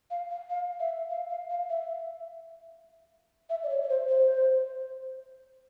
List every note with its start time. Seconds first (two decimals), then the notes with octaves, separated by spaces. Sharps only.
0.11 F5
0.31 F5
0.50 F5
0.80 E5
1.10 F5
1.30 F5
1.50 F5
1.70 E5
3.50 E5
3.64 D5
3.69 C#5
3.83 C#5
3.89 C5
4.09 C5